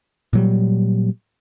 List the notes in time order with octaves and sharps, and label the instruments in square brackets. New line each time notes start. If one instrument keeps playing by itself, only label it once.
[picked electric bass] A#2 F#3 G3